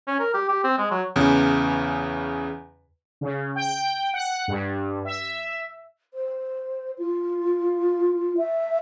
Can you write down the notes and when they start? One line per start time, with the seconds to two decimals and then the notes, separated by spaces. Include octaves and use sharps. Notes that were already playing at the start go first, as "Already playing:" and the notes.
0.07 C#4
0.19 A#4
0.34 G4
0.49 G4
0.64 C4
0.78 G#3
0.91 F#3
1.16 E2 C#3
3.21 C#3
3.56 G5
4.14 F#5
4.48 G2
5.05 E5
6.13 C5
6.98 F4
8.37 E5